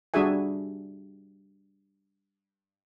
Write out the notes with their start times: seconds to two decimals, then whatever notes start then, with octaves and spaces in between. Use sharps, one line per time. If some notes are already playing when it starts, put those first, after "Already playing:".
0.14 G3 D4 F#4 G#4 E5 G#5